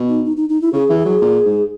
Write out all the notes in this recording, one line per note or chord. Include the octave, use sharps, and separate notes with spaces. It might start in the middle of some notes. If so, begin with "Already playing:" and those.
Already playing: B2
D#4
D#4
D#4
D#4
E4
C#3 G#4
E3
G#4
F#3
A#2
G#2